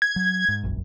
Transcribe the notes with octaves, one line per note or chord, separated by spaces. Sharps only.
G#6
F#3
G#2
E1 A#1 F#2